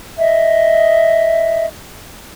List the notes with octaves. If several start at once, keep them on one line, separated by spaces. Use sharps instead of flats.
D#5 E5